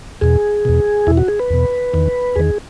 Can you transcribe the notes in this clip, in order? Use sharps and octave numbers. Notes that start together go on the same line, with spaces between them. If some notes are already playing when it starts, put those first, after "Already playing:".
E2 B2 G#4
E2 B2
E2 B2 E4
F#4
G#4
B4
E2 B2
E2 D#3
E2 D#3 G#4